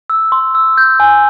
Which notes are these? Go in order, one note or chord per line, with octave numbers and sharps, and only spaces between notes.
E6
C6
E6
G6
G#5